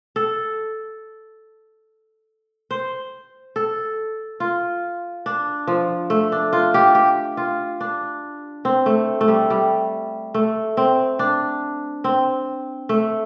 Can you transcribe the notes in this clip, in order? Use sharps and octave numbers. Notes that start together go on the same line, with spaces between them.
A4
C5
A4
F4
D4
F3
A3
D4
F4
G4
G4
F4
D4
C4
A3
A3
G3
G3
A3
C4
D4
C4
A3